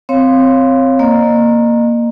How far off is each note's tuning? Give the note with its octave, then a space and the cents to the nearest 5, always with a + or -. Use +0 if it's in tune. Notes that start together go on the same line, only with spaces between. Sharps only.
C4 -10 C#5 -20 F5 +0
A#3 +0 D#5 -35